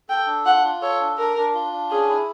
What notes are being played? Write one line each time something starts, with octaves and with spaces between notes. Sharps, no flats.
A4 G5
D4
F4 F#5
F4
A4 C#5
D4
D4 A#4
D4
F4
D4
C#4 G#4
E4